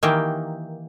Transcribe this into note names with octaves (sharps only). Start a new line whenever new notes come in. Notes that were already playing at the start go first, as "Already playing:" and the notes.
D#3 E3 A#3 G4